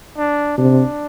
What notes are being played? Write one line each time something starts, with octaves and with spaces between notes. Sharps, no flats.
D4
C3 D4